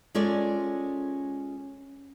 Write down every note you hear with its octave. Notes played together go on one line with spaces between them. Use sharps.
G#3 C#4 F4 A4 D5